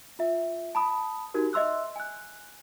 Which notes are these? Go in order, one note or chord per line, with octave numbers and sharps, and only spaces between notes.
F4 E5
A5 B5 D#6
D#4 F#4 G4 A#4
D#5 E5 C6 E6 F#6
G#5 F#6